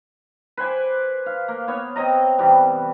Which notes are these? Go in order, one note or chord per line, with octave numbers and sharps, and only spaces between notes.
B4 C5 G#5 D6
F5
A#3
B3 C#5
C4 C#5 D#5 A#5
C3 E3 G3 B3